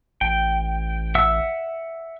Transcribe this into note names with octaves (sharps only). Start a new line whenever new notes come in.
A1 G5
E5 F#5 E6